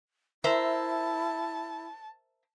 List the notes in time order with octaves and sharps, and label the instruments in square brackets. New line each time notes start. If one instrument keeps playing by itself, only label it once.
[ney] E4 [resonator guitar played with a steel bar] A#4 C5 E5 [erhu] A5